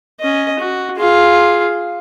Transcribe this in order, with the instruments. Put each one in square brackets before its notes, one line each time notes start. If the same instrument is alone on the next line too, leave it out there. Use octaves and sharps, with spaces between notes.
[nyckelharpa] C#4 D#5
F#4
F4 G#4